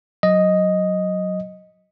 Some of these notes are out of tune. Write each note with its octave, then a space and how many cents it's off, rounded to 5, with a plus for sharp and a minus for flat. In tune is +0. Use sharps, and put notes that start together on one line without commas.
F#3 +0 D#5 +0